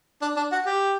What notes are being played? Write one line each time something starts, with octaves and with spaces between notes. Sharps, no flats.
D4
D4
F#4
G4